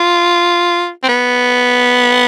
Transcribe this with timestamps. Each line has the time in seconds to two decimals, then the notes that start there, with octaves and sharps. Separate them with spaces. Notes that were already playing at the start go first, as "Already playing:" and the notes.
Already playing: F4
1.04 C4
1.09 B3